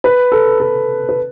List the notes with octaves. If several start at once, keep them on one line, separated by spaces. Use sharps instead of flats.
B4
A4
A4
B4